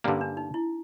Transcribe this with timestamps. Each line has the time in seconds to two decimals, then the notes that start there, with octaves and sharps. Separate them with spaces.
0.04 G2 D3 G3 A#3 C#4
0.21 D4
0.37 D#4
0.54 E4